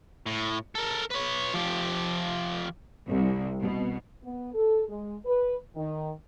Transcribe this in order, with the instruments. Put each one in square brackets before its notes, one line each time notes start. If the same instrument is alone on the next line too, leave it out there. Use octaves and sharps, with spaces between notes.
[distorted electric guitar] A2
A4 A#4
B4 C#5
F3 G4
[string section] C2
B2
[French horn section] B3
A4
G#3
B4
D#3